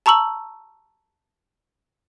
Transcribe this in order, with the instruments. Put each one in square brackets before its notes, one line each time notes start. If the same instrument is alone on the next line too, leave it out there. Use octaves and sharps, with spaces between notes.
[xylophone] A5 A#5 C#6 E6 F#7